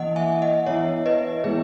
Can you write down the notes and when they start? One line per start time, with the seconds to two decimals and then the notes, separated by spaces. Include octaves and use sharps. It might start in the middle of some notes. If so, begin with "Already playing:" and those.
Already playing: E3 A#3 E4 D#5 F#5
0.16 E5 G#5
0.42 D#5 F#5
0.66 E3 B3 E4 C#5 E5
1.06 B4 D#5
1.44 E3 G#3 B3 E4 G#4 B4